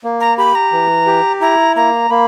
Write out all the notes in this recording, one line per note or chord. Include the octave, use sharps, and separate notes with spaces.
A#3
A#5
G4 B5
A#5
E3
G4
E4 A#5
A#3 A#5
A#3 B5